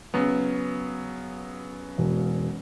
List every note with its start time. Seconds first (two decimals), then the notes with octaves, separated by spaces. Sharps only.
0.14 C#3 F#3 B3
1.98 E1